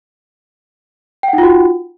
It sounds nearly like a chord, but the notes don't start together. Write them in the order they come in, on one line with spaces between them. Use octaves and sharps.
G5 F#5 D#4 F4 F#4